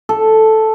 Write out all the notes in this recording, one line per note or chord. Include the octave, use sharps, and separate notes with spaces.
A4